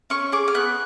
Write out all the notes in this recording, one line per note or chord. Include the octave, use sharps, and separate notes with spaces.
C#4 C#6
G#4 D6
F6
B3 F#6